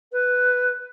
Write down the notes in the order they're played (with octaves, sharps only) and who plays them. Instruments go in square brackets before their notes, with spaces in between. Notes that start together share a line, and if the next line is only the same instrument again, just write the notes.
[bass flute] B4